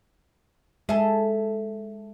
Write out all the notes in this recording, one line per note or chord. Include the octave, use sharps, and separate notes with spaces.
G#3 G#4 A4 E5